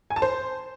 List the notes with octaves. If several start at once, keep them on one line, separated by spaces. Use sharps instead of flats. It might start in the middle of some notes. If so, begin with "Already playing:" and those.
G#5
A5
C5